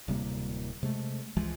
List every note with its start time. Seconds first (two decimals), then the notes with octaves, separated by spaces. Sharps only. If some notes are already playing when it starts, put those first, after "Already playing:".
0.08 D1 C3 G3 A#3
0.83 C3 G#3 A3
1.37 C#2 E3 F3 G#3